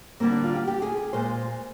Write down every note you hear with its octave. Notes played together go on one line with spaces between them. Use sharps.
D3 G3 A#3 C4
D4
F4
G4
G4
G#4
G#4
A#2 G#3 C5